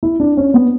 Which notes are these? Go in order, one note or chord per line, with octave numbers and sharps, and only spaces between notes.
E4
D4
C#4
B3